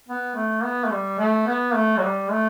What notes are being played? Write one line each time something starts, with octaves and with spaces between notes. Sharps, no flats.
B3
A3
B3
A3
G3
A3
B3
A3
F#3
G3
A3